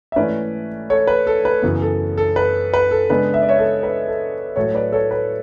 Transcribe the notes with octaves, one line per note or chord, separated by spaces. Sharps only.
E5
G#2 E3 A3 C#4 B4 D5
A4 C#5
B4
A4
B4
F#2 C#3 E3 B3
A4
A4
B4
B4
A4
C#3 G#3 B3 D4 B4
E5
D5
C#5 E5
A4
B4
A4
A2 F#3 A3 A4 C#5
B4 D5
A4 C#5
B4